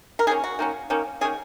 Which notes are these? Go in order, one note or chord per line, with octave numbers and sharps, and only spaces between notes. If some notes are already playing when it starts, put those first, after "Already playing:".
A#4
D#3 A#3 C#4 G#4
F#4
D#3 A#3 C#4
D#3 A#3 C#4
D#3 A#3 C#4 G#4